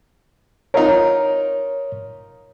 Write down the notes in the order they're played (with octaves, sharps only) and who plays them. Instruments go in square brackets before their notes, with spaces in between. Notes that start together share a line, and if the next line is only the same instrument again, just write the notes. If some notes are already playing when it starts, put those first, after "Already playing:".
[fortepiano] D#4 F4 A#4 [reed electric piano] C#5